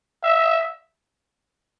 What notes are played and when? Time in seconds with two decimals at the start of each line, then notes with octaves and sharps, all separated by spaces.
0.23 E5